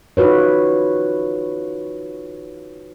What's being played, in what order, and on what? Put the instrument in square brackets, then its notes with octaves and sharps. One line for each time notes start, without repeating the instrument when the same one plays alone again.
[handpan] D#4 F4 F#4 B4 C#5